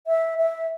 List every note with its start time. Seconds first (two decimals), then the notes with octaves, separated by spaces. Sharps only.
0.07 E5
0.38 E5